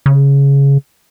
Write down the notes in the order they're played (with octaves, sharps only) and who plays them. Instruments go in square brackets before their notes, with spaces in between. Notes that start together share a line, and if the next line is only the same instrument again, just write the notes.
[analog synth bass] C#3